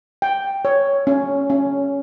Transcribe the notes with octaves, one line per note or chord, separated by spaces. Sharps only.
G5
C#5
C#4
C#4